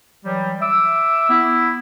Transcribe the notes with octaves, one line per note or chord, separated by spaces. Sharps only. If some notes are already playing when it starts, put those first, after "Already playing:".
E3 F#3 G3
E5 D6 E6
B3 E4